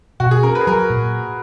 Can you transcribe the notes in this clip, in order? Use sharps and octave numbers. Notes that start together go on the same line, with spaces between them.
B2 F#4
G#4
C#4 A#4
B4
G#4
F#3 A#4
A#2